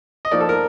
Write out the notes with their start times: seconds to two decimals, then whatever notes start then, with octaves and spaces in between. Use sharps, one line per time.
0.25 D#5
0.31 F3 A#3 D#4 D5
0.41 A4
0.49 A#4